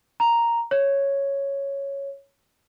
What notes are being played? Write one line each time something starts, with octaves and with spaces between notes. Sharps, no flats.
A#5
C#5